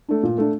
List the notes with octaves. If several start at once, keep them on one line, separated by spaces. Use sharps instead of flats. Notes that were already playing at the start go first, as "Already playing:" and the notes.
A3 D4
A#2
A3 D4